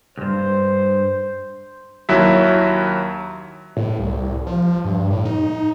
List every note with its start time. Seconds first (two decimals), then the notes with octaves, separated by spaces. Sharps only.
0.17 C#2 G2 C5
2.09 D#2 F#3 E4 E5
3.77 A2
3.99 C2
4.47 F3
4.84 G2
5.10 A2
5.25 D#4